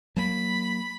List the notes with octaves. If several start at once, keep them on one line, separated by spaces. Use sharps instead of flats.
F#3 A#3 B5